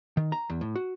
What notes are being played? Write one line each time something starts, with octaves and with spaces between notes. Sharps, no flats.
D#3
A#5
E2
A2
F#4